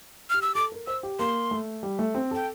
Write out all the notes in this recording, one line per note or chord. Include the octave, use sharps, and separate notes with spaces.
G4 F6
E6
A4 D6
A#4
C5 E6
G4
A#3 C6
A3
G3
A3
C4
A4 G5